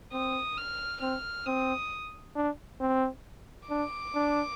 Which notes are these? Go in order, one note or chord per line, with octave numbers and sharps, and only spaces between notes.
C4 D#6
F6
C4 F6
C4 D#6
D4
C4
D4 D6
D4